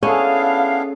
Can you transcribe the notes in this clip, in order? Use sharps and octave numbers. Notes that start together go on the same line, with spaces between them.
B3 C#4 D4 E4 G#4 A4 F5